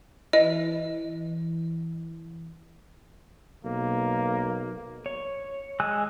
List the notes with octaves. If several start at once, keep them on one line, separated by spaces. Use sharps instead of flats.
E3 D#5
B1 A#3
C#5
G#3 G#5 E6 F#6